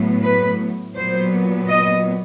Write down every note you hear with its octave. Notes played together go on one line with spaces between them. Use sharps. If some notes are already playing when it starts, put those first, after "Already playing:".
Already playing: A2 F#3 B3
B4
A#2 F#3 B3 C5
D#5